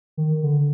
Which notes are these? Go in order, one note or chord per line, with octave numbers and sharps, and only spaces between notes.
D#3
D3